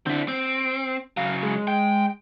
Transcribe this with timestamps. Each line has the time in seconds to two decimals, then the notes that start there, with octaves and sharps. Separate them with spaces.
0.07 D3 C4 E4
0.28 C4 D7
1.17 C#3 F#3 F5
1.43 G#3
1.68 G#3 G5